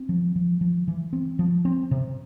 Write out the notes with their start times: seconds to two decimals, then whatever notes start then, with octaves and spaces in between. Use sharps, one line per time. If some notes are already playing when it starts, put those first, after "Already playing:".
Already playing: C4
0.09 F3
0.36 F3
0.61 F3
0.88 E3
1.13 C4
1.39 F3
1.65 C4
1.91 C3